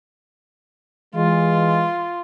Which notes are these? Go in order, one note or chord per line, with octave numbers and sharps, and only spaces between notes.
E3 G#3 F4